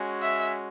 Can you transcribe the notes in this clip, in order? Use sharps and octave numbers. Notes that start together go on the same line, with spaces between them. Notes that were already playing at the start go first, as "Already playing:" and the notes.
Already playing: G#3 C#4 F#4
E5